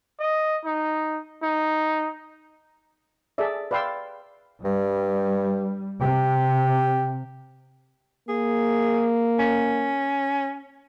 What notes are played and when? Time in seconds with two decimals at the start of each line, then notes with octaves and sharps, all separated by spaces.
0.19 D#5
0.65 D#4
1.42 D#4
3.38 G#4 A4 D5 E5
3.71 B4 D5 F5 G5 C6 E6
4.65 G2 G3
6.02 C3 G4
8.29 A#3 G#4
9.39 C#4